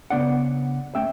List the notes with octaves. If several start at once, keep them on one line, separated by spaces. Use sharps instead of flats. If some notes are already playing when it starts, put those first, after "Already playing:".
C#3 E3 B3 D4 D5 F#5
A3 C#4 E5 G5